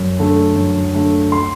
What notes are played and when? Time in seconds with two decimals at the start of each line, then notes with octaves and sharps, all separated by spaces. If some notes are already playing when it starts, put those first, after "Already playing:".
Already playing: F#2
0.19 D3 A3
0.56 F#2
0.94 D3 A3
1.32 C6